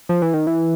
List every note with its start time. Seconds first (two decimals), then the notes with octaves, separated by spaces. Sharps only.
0.09 F3
0.22 E3
0.34 D#3
0.47 E3